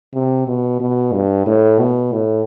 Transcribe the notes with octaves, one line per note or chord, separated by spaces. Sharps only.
C3
B2
B2
G2
A2
B2
A2